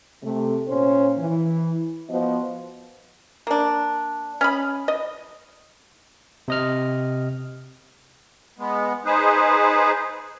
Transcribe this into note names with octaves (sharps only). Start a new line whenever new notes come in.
C3 A3
A#2 C#4 C5
E3
F3 B3 F#4 C5 D#5
A#3 D4
C#4 D#5 B5
D#5
C3 D#5 F6
G#3 B3
D#4 G#4 B4 C5